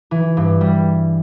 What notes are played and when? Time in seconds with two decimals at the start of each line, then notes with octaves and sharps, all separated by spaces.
0.11 E3
0.37 G2
0.61 G3